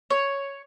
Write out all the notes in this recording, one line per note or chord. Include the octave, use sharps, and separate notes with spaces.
C#5